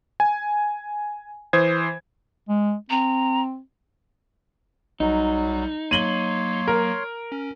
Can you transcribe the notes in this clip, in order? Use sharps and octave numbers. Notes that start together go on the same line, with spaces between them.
G#5
E3 C5 D#6 G#6
G#3
C4 A#5
B1 F#3 G3 D#4
F#3 A#3 C#5 C6 D#7 F#7 G7
A#4
C#4